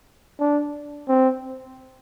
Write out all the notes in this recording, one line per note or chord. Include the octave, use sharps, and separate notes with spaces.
D4
C4